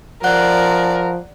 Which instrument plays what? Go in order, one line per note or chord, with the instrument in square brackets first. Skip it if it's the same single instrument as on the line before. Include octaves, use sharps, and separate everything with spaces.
[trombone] F3 [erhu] A#4 [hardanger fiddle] D5 [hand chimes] F#5 F#6